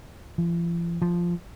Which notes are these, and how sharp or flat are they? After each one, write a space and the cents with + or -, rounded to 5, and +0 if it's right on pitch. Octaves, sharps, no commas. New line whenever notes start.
F3 -45
F3 -5